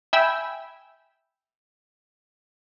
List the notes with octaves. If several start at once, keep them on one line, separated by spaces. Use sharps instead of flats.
E5 G5 G#5 B5 E6